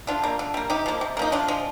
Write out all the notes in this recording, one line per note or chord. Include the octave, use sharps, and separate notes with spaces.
D3 D4 F4
G3 A#3
D3
G3 A#3
C3 D#4 G4
F3 A#3
C3
F3 A#3 D#4
C3 D4 F4
F3 G#3